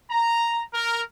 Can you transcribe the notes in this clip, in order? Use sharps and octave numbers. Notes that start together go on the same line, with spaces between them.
A#5
A#4